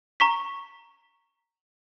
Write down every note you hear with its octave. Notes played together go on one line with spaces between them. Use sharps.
A#5 C#6 B6